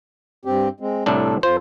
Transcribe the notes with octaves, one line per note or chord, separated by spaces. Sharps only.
G2 C4 G4
G#3 C4
C2 A2 D4 A4
F2 F4 C5